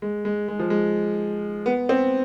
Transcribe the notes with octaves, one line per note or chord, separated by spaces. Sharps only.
G#3
G#3
G#3
F3
G#3
B3
C4